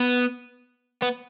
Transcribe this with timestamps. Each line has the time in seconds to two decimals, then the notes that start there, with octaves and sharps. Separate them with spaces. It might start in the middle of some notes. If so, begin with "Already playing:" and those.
Already playing: B3
1.02 B3